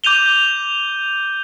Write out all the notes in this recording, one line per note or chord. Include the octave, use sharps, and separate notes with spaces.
D6 G6 D#7 F7 G7